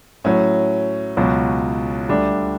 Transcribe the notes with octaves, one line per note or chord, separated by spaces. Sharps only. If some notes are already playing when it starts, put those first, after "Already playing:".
A2 F#3 C#4
C#2 B2 F#3
D2 D3 G3 D4